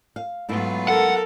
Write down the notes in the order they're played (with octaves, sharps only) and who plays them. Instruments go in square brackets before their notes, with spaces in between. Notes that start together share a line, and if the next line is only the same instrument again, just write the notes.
[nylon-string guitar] F5
[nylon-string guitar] G#2 A3 E4 [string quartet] F#3 B3 F4
[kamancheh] A4 A#4 [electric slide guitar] F#5